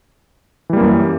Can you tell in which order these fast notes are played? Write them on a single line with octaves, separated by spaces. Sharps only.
E3 G3 A#3 F#2